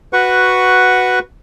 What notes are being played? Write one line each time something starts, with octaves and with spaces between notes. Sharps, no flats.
F#4 B4 F#5 C#6